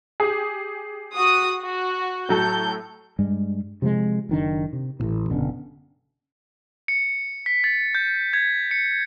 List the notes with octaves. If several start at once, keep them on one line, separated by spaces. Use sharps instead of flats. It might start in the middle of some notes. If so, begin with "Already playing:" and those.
G4 G#4
F#4 D#6
F#4
A2 F#3 A4 G6
G2 G3 G#3
C3 F3 F#3 G#3
F#1 D#3 D4
C3
A1 A2 C3
F#1 B2 D3 C#4
C#7
B6
A6
G6
G#6
C#7